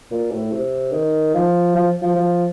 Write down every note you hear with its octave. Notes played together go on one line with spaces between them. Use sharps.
A#2
A2
C3
D#3
F3
F3
F3
F3